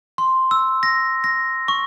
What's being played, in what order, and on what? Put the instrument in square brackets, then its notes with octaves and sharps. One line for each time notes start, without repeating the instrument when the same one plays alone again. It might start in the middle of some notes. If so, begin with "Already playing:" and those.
[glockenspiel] C6
E6
A#6
A#6
C#6